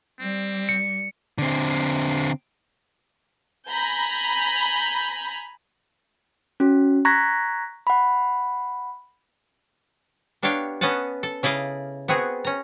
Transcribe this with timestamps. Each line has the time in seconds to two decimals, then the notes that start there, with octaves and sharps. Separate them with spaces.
0.20 G3 C4
0.69 C#7
1.38 D3 C4
3.68 G#5 A#5 B5 G6
6.60 C#4 F#4
7.05 A#5 C#6 F#6 G#6 A#6 B6
7.87 F#5 B5
10.43 B3 D4 G4 C#5 F5 G5
10.81 B3 C#4 D#5 F#5 A5
11.23 A4
11.43 C#3 E4 D5 D#5 F5
12.08 B3 C4 F#4 G#4
12.44 C#4 A#5